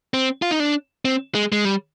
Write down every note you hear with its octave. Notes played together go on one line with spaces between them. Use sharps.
C4
F4
D#4
D4
C4
G#3
G#3
G3